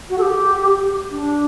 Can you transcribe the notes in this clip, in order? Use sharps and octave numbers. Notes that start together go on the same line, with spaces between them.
F#4
A4
G4
D4